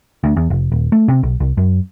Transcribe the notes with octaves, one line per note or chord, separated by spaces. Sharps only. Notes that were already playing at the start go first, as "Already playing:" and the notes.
D2
E2
F1
D#1
A3
C3
B1
C2
F#2